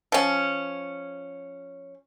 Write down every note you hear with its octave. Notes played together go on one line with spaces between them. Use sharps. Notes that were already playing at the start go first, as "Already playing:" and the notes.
F3 C#4